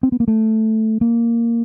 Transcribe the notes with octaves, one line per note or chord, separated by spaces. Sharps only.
C4
B3
A#3
A3
A#3